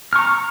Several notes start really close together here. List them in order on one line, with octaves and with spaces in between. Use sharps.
F6 C#6 A#5